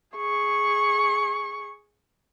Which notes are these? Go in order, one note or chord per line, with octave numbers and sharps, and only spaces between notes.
G#4 C#6